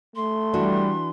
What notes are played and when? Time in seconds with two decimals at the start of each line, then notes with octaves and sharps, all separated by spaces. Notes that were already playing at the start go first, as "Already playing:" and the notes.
0.16 A3 C6
0.53 E3 G3 D4 F#4